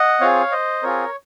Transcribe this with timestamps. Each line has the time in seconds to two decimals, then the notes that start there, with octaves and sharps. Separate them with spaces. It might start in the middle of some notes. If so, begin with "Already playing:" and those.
Already playing: D#5 F#5
0.21 C4 F4 G#4 C#5 F5
0.52 C5 D#5
0.83 C4 F4 G#4 A#4 C#5